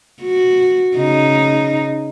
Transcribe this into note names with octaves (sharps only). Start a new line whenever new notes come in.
F#4
C#3 D#4